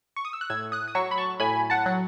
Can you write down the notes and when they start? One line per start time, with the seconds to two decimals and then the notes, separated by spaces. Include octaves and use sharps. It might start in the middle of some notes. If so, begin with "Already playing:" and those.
0.16 C#6
0.25 D#6
0.33 E6
0.41 F#6
0.50 A2 E6 G#6
0.72 D#6 F#6
0.88 D#6
0.95 F#3 C#6 E6
1.11 B5
1.18 A5 C#6
1.40 A2 G#5 B5
1.70 F#5 A5
1.86 F#3